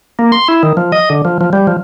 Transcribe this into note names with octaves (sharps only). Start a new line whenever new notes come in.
A#3
C6
E4
D#3
F3
D#5
D3
F3
F3
G3
F3